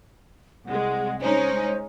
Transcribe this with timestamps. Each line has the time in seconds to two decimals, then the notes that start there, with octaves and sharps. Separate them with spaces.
0.66 C2 G#3 F#5
1.21 G#3 C#4 D#4 C5